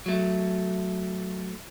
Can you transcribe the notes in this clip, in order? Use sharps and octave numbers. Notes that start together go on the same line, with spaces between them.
F#3 A3